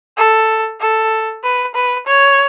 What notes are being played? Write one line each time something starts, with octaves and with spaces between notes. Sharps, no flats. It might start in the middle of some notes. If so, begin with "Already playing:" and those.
A4
A4
B4
B4
C#5